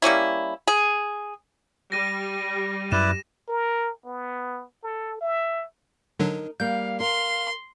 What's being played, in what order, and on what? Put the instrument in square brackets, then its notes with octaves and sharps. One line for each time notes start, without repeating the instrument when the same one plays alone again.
[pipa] G3 A#3 C#4 E4
G#4
[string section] G3 [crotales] A#6 D#7
[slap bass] F#2 [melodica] E4 B4 D5 [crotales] E7
[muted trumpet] A#4
B3
A4
E5
[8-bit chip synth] D3 F#3 D4 [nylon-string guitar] D#4 A#4
[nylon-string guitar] G3 A#3 [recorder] F5 [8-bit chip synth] G6
[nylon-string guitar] A#4 [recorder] F5 [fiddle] C6